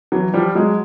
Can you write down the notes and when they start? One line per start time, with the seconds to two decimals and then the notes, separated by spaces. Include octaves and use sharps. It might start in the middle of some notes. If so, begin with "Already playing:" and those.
0.12 E3 F#3
0.34 F3 G3
0.55 F#3 G#3